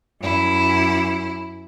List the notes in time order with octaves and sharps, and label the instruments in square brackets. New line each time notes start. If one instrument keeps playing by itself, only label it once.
[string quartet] F#2 E4